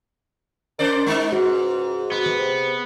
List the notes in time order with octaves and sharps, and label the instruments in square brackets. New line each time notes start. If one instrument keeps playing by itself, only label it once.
[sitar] C#4 C5 D5 [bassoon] A#4
[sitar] G#3 D#4
[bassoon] C#2 [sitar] G#2 [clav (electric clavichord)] F#4
[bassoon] B2 [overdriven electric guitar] B3
[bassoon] C3